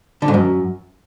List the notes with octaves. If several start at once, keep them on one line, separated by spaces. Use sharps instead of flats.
D3
G#2
F#2